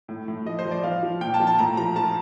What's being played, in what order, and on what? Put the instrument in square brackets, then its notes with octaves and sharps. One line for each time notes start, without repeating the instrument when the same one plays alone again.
[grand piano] A2
A2
F3 D#5
C5
F3
D5
F3 F5
F3
A#2 G5
A5
F3
A5
A2 A#5
F3 A#5
F3 A5